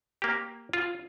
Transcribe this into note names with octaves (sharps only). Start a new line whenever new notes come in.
A#3 G4
F4